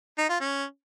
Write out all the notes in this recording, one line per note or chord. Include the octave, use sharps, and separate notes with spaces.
D#4
F4
C#4